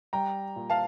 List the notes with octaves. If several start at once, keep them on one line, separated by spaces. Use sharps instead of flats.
G3 G5 A#5
A#2
F5 A5